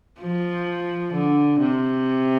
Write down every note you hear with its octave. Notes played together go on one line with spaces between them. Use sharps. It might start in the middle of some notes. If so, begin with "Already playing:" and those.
F3
D3
C3